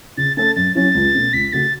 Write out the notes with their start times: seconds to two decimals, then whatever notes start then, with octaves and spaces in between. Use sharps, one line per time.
0.17 C#3 A6
0.37 A3 C#4 A4 A6
0.56 F#2 A6
0.75 F#3 C#4 E4 A6
0.95 C#2
1.15 B2 A3 C#4
1.33 C#2 B6
1.53 C#3 A3 F#4 A6